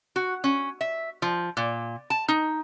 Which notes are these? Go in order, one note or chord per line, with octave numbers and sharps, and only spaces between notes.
F#4
C#4
E5
F3
A#2
A5
D#4